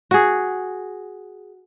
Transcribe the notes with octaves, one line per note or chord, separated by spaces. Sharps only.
F#4 G#4